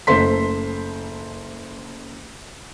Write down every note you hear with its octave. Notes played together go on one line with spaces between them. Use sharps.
F#1 A3 C5 C6 B6